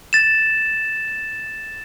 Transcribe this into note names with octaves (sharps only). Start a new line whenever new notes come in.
A6 E7